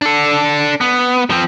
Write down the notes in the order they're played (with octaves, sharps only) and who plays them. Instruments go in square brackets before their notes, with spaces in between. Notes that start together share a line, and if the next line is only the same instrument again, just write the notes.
[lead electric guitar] D4 A4
B3
F3 C4